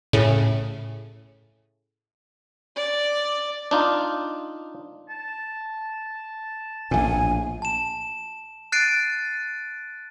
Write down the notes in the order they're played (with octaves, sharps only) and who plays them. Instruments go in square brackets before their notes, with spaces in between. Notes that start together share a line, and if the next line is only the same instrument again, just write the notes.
[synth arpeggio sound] A2 C#3
[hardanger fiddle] D5
[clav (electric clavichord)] D4 D#4 F4
[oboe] A5
[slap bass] A#1 A2 [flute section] G#5
[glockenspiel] A5 E7
F#6 A6 C7 D7 D#7